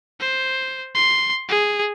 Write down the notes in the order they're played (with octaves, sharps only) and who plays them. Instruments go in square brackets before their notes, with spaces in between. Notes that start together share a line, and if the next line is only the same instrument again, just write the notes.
[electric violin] C5
C6
G#4